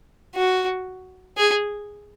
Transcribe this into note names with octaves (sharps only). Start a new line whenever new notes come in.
F#4
G#4